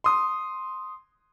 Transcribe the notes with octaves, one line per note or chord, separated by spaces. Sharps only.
C6 D#6